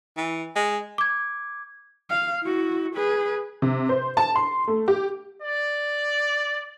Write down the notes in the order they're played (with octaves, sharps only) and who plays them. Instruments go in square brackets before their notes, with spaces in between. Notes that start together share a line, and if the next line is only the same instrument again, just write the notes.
[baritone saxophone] E3
G#3
[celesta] D6 G#6
[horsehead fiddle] F5
E4 F#4
G#4 B4
[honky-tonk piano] C3
C5
A5
C6
A3
G4
[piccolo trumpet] D5